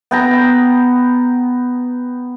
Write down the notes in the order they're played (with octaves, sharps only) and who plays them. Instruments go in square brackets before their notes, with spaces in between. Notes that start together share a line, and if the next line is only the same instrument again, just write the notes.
[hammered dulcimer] B3 G5 A#5